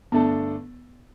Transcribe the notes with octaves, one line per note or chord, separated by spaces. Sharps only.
G2 D3 A3 B3 D4 A4